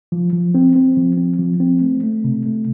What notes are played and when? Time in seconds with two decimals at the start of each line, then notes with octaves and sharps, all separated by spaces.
0.12 F3
0.33 F3
0.55 C4
0.76 C4
0.97 F3
1.17 C4
1.39 F3
1.60 C4
1.81 A3
2.03 A3
2.24 C3
2.46 A3